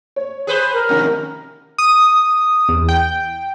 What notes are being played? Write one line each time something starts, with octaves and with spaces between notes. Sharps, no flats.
C#5
G#4 B4 C5
A#4
F2 C3 D#3 C#4
D#6
E2
G5